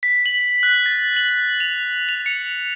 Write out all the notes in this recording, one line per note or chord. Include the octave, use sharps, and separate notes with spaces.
B6
F#7
F#6
A6
F#7
F7
F7
C#7